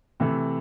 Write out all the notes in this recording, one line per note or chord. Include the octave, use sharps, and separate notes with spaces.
C3 E3 A3